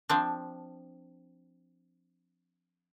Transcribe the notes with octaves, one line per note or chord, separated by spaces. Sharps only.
F3 C4 D4